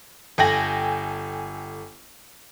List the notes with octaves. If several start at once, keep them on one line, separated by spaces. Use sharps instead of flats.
G1 A4 G5 G#5 A#6 F#7